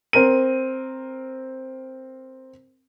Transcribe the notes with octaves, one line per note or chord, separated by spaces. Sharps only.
C4 A#4 D#7